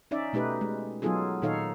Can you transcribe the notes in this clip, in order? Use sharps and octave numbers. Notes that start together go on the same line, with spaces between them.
C#4 D#4 D5 E5
B2 A3 D#4 G4 B4
G#3
F#3 B3 D#4 F4 G#4 A4
A#2 D#3 D#4 A4 C#5 F5